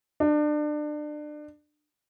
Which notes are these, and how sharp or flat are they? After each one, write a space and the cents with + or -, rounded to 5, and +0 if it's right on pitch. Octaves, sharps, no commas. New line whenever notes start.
D4 +30